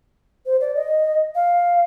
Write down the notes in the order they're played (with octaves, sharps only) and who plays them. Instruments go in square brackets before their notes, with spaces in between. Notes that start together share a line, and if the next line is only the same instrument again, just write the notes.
[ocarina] C5
D5
D#5
F5